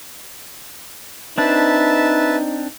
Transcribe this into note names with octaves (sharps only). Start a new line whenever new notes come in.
C4 D4 D#4 B4 E5 A5